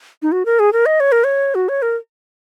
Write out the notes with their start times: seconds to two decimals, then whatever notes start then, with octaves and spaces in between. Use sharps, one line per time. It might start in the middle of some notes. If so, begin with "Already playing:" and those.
0.22 D#4
0.32 F#4
0.46 A#4
0.59 G#4
0.73 A#4
0.86 D#5
1.00 C#5
1.12 A#4
1.24 C#5
1.55 F#4
1.69 C#5
1.82 A#4